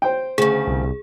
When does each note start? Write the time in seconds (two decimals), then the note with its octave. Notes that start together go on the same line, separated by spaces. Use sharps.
0.02 C5 G5
0.38 D2 C#3 G#4
0.67 C2